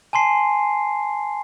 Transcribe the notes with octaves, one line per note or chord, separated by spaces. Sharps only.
G#5 A5 C6 C7